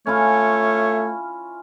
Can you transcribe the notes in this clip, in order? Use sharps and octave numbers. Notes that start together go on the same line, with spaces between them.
A3 C#4 E4 F4 C#5